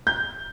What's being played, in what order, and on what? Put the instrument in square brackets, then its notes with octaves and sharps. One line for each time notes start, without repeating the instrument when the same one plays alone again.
[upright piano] G6